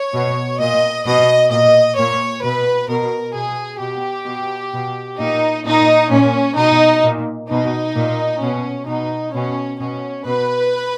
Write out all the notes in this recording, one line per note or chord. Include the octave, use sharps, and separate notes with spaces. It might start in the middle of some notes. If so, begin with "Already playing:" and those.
Already playing: C#5
B2
A#2 D#5
B2 D#5
A#2 D#5
A#2 C#5
B2 B4
B2 A#4
B2 G#4
B2 G4
B2
B2
A#2 D#4
A#2 D#4
A#2 C#4
B2 D#4
A#2
B2 D#4
A#2
B2 C#4
B2 D#4
B2 C#4
B2 C#4
B2 B4